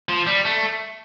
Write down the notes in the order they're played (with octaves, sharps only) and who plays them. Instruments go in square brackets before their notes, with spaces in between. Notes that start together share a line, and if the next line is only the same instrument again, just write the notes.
[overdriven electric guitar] F3
G3
A3